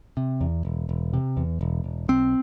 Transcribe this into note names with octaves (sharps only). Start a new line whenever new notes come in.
C3
E2
E1
E1
C3
E2
E1
E1
B1 C4